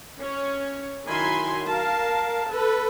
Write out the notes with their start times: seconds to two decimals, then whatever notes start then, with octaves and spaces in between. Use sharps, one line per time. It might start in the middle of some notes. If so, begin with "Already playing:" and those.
0.20 C#4 C#5
1.07 D#3 F#3 E4 G#5 B5 C6
1.66 A#4 F5 A5
2.49 A4 B4